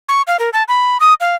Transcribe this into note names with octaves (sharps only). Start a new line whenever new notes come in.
C#6
F5
A#4
A5
B5
D#6
F5